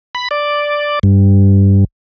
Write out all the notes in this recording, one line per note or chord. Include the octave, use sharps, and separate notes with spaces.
B5
D5
G2